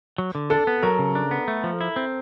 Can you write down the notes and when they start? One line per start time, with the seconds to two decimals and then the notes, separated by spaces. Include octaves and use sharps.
0.18 F#3
0.35 D3
0.50 D4 A4
0.67 B3
0.83 F#3 A#4
0.99 C#3
1.15 D4
1.31 B3
1.48 A3
1.64 F3
1.81 E4
1.96 C4